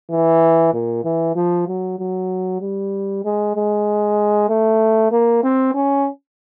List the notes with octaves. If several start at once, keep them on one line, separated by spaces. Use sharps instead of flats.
E3
A#2
E3
F3
F#3
F#3
G3
G#3
G#3
A3
A#3
C4
C#4